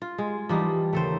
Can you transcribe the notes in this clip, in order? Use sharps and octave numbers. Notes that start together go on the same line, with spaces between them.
F4
G#3
E3 F3 G3 D#4
D#2 C#3 A3 A4 C5